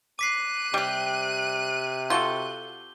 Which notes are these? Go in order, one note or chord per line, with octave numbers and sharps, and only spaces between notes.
D6 F#6 B6 C7 D#7
C3 G3 G4
F4 F#4 A4 G6 G7